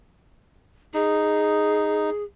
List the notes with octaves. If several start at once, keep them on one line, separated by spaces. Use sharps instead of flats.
D#4 G#4